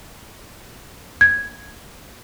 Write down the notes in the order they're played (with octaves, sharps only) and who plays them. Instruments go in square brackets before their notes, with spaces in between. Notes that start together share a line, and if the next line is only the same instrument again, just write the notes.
[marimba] G#6